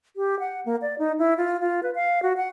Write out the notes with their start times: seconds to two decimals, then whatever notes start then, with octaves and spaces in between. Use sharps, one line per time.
0.16 G4
0.39 F#5
0.66 A#3
0.82 D5
0.99 D#4
1.19 E4
1.37 F4
1.60 F4
1.83 B4
1.95 F5
2.22 F#4
2.37 F#5